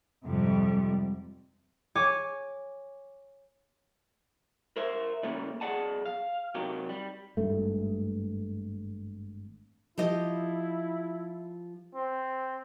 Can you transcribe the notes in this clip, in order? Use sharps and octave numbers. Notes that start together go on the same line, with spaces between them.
F2 G#2 C3 G3
C#5 G#5 D6
A#4 C5 E5
C#3 G3 A3 A#3 C#4
B1 G#4 D5 F#5 A5
F5
C3 D#3 F#3 G4
G3
G#1 G2 A3
F3 E4 G4 D#5
C4